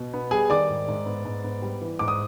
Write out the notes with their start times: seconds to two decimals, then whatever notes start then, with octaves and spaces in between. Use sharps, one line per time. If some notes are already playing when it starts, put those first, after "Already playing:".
Already playing: B2
0.14 B3
0.31 G3 G#4 G#5
0.50 D#3 D5 D6
0.69 G#2
0.88 G#2
1.06 B3
1.25 G#2
1.44 B3
1.62 G3
1.81 E3
1.99 G#2 D6
2.08 D#6